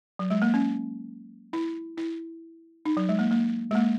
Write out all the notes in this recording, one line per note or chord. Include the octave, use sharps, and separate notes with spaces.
F#3
G#3
A#3
C#4
E4
E4
D#4
F#3
G#3
A#3
A#3
G#3
A#3